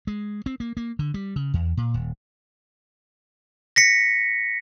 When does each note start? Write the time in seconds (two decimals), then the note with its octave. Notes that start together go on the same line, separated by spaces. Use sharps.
0.07 G#3
0.46 C4
0.60 A#3
0.77 A#3
0.99 D3
1.14 G3
1.36 C#3
1.54 E2
1.77 A#2
1.94 D#1
3.76 A#6 B6 C#7